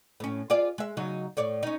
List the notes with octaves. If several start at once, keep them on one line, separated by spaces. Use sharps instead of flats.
A2 C#4
F4 G#4 D5
G#3 E5
C#3 F#3 D#4
A2 C#5 D5
C#4 D#4